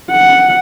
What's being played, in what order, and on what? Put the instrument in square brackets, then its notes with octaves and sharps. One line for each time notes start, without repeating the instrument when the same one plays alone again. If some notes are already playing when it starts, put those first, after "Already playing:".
[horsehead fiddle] F#5